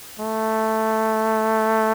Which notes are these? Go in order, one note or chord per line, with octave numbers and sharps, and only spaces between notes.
A3